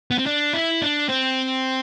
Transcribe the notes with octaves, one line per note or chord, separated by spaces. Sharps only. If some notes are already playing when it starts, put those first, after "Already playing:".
B3
C4
D4
E4
D4
C4